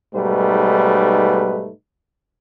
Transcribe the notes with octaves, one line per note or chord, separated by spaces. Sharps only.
B1 G#2 G3 A3 D#4 B4